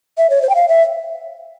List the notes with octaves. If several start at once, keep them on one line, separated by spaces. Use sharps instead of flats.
E5
C#5
C5
G5
F5
E5